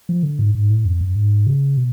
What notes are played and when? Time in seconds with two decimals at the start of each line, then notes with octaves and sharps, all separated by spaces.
0.09 F3
0.23 D3
0.39 G#2
0.55 G#2
0.70 A2
0.85 F2
1.01 F#2
1.16 G#2
1.47 C#3
1.77 B2